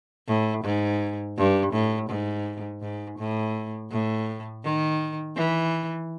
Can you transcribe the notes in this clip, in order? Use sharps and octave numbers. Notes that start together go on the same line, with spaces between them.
A2
G#2
G2
A2
G#2
G#2
A2
A2
D#3
E3